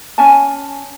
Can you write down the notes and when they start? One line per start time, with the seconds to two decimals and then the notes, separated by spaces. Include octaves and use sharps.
0.18 C#4 G#5 A5